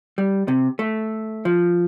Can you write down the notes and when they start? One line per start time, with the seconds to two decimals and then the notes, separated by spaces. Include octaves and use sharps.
0.18 G3
0.48 C3
0.79 A3
1.45 F3